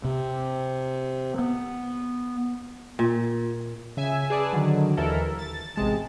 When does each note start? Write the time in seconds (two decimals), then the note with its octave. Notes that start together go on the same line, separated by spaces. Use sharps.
0.04 C3
1.39 B3
2.99 A#2
3.97 C#3 E5 G#5
4.30 G#4 B4 D5 A5
4.53 D3 D#3 F#3
4.97 D#2 E3 E4 A4 A#4
5.39 A6
5.76 A1 C3 G#3 A5